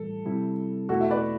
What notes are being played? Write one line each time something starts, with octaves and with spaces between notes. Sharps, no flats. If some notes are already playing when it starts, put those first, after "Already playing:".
Already playing: A2 E3 G3 A4
C3 G3 C4 E4
E2 B2 A3 E4 F#4 A4
E5
B4 D5